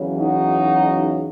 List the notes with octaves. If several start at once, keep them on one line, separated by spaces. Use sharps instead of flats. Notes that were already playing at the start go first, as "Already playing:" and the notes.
Already playing: E2 C#3 F#3
D#4 F#4